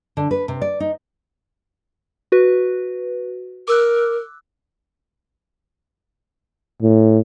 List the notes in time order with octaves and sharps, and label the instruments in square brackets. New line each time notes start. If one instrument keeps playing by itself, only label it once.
[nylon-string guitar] D3
B4
C3
D5
D#4
[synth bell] F#4 B4
[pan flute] A#4 [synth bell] D6 E6 F#6
[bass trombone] A2